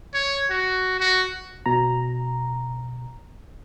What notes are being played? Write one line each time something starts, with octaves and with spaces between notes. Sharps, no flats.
C#5
F#4
F#4
B2 A#5